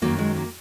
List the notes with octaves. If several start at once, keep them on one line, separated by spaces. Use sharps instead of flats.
F#2 D#3 F#3 A#3
G#3
A#3